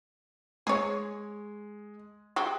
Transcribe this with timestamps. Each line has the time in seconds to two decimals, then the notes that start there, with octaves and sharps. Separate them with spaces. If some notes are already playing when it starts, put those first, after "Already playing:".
0.67 G#3 G#4 C#5
2.36 G#3 F#4 G4